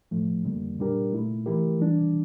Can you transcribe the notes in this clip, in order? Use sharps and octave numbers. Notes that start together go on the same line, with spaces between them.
A2 F3 A3
F2 D3 G3 A#3
A#2 G3 D4 G4 A#4
A#2 A3 E4
E3 A3 E4 G4 A#4
E3 G3 D4